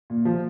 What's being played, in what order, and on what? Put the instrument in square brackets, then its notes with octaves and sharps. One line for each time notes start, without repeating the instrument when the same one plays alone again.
[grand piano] A#2
F3